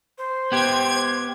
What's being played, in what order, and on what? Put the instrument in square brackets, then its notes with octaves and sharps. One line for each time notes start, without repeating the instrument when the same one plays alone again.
[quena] C5
[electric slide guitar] B3 G4 [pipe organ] G#6